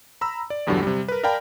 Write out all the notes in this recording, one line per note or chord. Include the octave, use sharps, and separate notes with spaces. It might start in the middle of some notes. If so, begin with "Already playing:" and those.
A#5 B5 E6
D5
A1 E2 G2 D3 F#3 G3
C3 G3
A#4 B4
A#4 D5 F5 G5 A5 B5